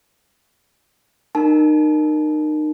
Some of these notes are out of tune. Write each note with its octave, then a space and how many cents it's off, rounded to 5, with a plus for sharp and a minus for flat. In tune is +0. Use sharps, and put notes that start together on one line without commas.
D#4 -30 A#4 +0 A5 -40